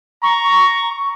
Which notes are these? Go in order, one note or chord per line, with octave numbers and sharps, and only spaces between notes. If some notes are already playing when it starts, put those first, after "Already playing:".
A#5 C#6